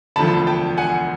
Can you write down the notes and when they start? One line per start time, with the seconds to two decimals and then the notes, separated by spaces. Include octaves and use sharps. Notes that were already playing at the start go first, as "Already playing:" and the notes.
0.16 E1 D2 D3 F3 A5 B5
0.47 G5 A5
0.77 F#5 G#5